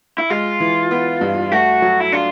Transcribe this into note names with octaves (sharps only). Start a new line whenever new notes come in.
E4
G#3 F4
E3
B3
G2
A3 F#4
F#3
E4
D4 F4